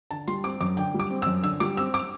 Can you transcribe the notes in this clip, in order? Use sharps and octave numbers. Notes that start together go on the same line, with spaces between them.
D3 A5
G3 C6
C4 D6
F#2 D6
D3 G5
G3
D6
C4
E6
F#2
D3 E6
G3 D6
C4 E6
D6